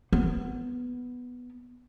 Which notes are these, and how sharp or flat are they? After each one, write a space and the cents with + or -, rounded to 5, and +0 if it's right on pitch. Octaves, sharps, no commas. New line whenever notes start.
B3 +0